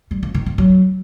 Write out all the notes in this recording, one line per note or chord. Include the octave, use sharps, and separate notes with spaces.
G3
F2
D#3
F2
F#3